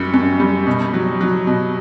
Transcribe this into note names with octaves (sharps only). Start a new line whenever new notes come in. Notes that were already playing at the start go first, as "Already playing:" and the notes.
Already playing: F#2 G3
F#2
G3
B2
F#3
F#3
B2